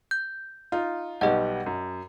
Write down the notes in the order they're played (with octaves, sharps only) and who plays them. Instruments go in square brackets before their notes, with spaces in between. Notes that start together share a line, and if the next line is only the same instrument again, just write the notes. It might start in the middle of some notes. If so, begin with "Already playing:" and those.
[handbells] G6
[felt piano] D#4 F4
[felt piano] B1 G3 B3 [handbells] D#5 F#5
[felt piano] F#2